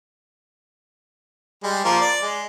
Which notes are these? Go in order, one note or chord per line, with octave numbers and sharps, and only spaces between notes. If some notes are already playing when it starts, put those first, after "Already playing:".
G3 G#3
F3 A#3 C5
D5
G#3